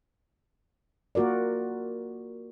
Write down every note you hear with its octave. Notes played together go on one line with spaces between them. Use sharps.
A#3 F4 F#4 A#4 D5